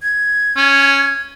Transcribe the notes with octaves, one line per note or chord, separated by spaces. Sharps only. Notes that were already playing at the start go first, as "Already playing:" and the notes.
G#6
C#4